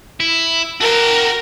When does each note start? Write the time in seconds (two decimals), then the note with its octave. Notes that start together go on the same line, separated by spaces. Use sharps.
0.20 E4
0.81 F#4 A#4 G5